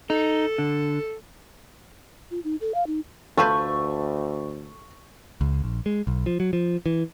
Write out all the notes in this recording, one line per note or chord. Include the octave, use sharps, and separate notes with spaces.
D#4 A4
D3
F4
D#4
A4
F5
D#4
D2 A3 F4 B4 C5 C#6
C#2
A#1
G#3
B1
F3
F#3
F3
E3